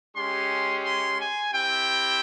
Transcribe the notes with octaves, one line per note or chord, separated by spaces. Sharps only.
G#3 C#4 G4 C6
C6
G#5
C4 E4 G4 G5